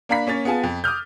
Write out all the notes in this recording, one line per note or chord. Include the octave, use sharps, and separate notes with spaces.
A#3 D4 F5 A#5 B5 B6
A#3 C#4 C#5 A6
B3 F4 G#4 G#5 A5
F2
D6 D#6 F6 G6